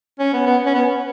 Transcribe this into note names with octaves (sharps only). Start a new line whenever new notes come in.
C#4
B3
B3
C#4
B3